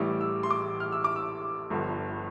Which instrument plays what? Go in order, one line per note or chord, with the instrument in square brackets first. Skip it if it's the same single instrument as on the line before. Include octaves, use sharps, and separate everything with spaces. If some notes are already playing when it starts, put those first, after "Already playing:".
Already playing: [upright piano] A1 A2 E3 G3 D6
E6
C6
D6
F6
E6
D6
E6
G1 G2 D3 F3